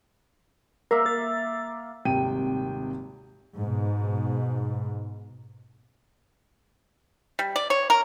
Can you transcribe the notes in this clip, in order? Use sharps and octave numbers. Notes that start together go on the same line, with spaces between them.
A#3 A#4 E5 F5
A6
D#1 G#1 C3 G5 D#7
G#2 B2
G3
D5
C#5
A#4